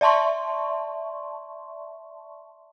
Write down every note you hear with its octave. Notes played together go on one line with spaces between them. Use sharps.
D5 E5 A5 C6 C#6